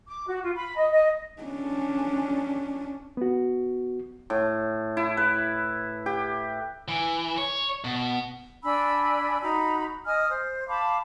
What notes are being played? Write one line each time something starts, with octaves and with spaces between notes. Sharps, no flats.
D6
F#4
F4
B5
D#5
D#5
C#4 D4
B3 F#4
A2
E4
B4
G4
E3
C#5
B2
D4 G#5 B5 E6
D#4 F#4 A#5 B5
D#5 G#5 D#6 F6
C5
F5 A5 B5 D6